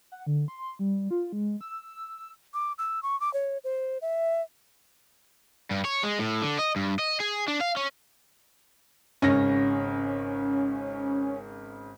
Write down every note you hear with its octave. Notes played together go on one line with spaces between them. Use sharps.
F#5
D3
C6
G3
F4
G#3
E6
D6
E6
C#6
D6
C#5
C5
E5
G2
C#5
G#3
A2
D3
D#5
G2
D#5
G#4
D4
F5
C#4
G#1 C#3 C#4 A#6